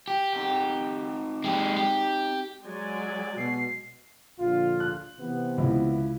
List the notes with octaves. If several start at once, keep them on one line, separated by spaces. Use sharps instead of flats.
G4
C4 D#4 G5
G#3 G4
G4
F#3 G#3 D5 G#5
B2 C7
A#1 D3 F4
F#6
C3 E3 B3
C#2 E4